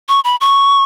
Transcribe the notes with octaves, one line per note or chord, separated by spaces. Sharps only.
C#6
B5
C#6